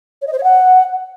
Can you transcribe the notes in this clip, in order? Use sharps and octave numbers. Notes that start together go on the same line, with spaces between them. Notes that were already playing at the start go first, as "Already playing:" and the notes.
C#5
D#5
C5
C#5
F#5